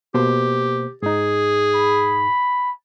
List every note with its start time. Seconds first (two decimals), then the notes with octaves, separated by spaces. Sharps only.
0.14 B2 A#3 G4 C5
1.02 G#2 D#4 G#4
1.75 B5